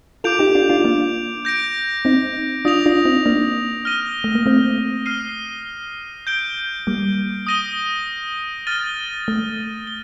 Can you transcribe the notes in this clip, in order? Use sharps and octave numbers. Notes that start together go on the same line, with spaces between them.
F4 A4 D6 G6 D7 F7
D#4 G4
D4 F4
D4 F4
A#3 D4
G6 A#6 D7
C4 D#4
D4 F4 D#6 A#6 F7
D4 F4
C4 D#4
A#3 D4
F6 A#6 D#7 G7
A3
A#3
A3 C4
F6 C7 D#7 G7
G6 D7 G7
G3 A#3
D#6 A#6 D#7 G7
F6 A6 D#7 G7
A3
G7